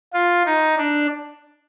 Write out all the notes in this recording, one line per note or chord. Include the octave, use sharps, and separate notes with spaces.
F4
D#4
D4